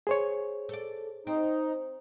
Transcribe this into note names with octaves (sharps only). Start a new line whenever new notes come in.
G#4 C5 C#5
A4 D5
C4 D#4